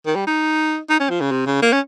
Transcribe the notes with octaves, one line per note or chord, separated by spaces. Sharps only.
D#3
G3
D#4
D#4
C#4
F3
C#3
C3
C#3
A#3
C#4